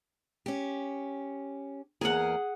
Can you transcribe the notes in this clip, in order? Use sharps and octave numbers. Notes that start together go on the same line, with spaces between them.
C#4 G4
E2 A#3 G#4 A#4 F#5